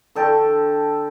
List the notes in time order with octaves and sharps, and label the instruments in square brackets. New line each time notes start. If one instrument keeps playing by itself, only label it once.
[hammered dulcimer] D3 A4 G5 C#6